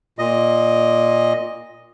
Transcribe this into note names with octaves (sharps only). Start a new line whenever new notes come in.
A#2 D#5